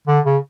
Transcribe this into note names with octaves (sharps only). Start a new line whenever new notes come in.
D3
C#3